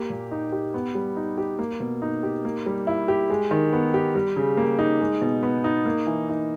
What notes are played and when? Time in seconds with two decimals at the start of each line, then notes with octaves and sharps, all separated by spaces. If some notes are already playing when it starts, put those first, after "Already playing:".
Already playing: A#3 G4
0.10 A#2
0.31 D#4
0.52 G4
0.74 B3
0.95 G3
1.17 D#4
1.38 G4
1.59 A#3
1.80 B2
2.02 D#4
2.23 G4
2.45 A#3
2.66 G3
2.87 E4
3.08 G4
3.30 G#3
3.51 D#3
3.73 B3
3.94 G4
4.15 G3
4.36 C#3
4.57 A#3
4.79 D#4
5.01 G#3
5.21 B2
5.43 B3
5.64 D#4
5.86 A#3
6.07 E3
6.29 D#4